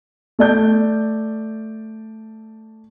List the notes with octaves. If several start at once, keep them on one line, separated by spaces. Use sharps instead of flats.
A3 D5 G6